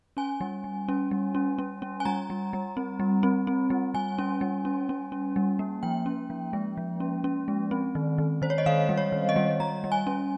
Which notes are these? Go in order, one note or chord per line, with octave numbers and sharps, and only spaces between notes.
C#4 G#5
G3
G3
C#4
G3
C#4
C#4
C#4
G#5
G3 A#5
G3
G3
C4
G3
C4
C4
G3
G3 G#5
C#4
G3
C#4
C#4
C#4
G3
A#3
F3 G5
C#4
F3
G#3
F3
C#4
C#4
G#3
C4
D#3
D#3
D#3 C5
C#5
D#5
D#3 F5
G3
C#5
D#3
D#5
G3
G3 A#5
G3
G#5
C#4